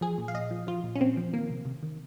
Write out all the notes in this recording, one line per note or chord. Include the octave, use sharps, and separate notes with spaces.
F3 G#4
A#2
F5
A#2 D#5
F3
F3 F4
A#2
C#4
A#2 C4
F3
D#3 A#3
C3
C3
D#3